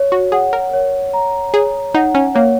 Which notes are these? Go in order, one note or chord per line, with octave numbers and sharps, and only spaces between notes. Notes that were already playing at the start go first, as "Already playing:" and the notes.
Already playing: C#5
F#4
G#4 F#5
A#4
C#5
A#5
G#4 C#5
D#4 F#5
C#4
A#3 C#5